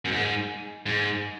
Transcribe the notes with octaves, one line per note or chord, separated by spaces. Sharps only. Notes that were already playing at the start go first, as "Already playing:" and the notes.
F#2
G#2
G#2